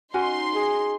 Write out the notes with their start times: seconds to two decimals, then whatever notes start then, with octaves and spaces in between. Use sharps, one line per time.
0.14 C#4 D#4 F#4 G#5 C6
0.55 G#4